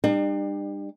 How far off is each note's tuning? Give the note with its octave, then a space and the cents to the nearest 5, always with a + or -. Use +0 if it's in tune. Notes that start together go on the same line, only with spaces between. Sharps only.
G3 +25 D4 +40